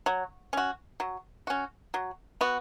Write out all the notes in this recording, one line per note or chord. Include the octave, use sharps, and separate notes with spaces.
F#3
C#4 F#4
F#3
C#4 F#4
F#3
B3 F#4